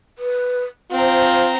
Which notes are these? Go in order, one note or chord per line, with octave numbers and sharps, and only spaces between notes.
B4
C4 F4 C5 A#5